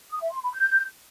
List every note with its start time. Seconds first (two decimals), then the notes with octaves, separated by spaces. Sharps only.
0.11 D#6
0.21 E5
0.32 C6
0.43 B5
0.54 G6